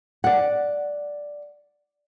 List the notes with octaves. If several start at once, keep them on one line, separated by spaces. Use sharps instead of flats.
D5 F#5